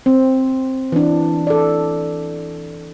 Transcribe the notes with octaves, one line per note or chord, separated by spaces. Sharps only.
C4
E3 D4
A4 D5